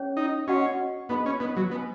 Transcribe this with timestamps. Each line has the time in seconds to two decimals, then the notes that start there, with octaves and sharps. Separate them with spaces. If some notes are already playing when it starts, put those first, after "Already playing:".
Already playing: C#4 G#4 C#5
0.17 D#4
0.47 C#4 F#4 D#5 F#5 C#6
1.09 B3 D#4 G#4 D#5 B5
1.26 C#4
1.40 B3
1.56 F#3
1.71 B3 F#4 B4 G#5